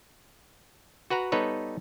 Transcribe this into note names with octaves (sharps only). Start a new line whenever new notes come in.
F#4 B4 F#5 A#5
G3 B3 D#4 A4 B4 C#5